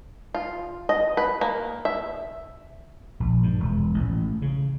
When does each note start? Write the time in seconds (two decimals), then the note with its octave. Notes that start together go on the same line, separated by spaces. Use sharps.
0.34 F4
0.89 D#5
1.17 B4
1.41 A#3
1.85 E5
3.20 A#1
3.43 G2
3.60 E1
3.94 A1
4.42 C#3